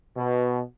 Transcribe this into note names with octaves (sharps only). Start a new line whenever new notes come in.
B2